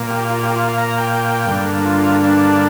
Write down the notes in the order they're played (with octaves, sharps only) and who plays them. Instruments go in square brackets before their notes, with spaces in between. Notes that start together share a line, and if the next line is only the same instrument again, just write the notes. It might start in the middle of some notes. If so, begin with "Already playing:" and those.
Already playing: [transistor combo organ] A#2 A#3
G4
F4
G4
F4
F5
A#5
A#5
G5
G2 D3 A#3
F4
D4